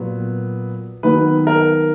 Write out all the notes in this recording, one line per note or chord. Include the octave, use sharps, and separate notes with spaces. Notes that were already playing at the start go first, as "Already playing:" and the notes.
Already playing: A#2 F#3 B3
D#3 F#3 B3 B4
A#4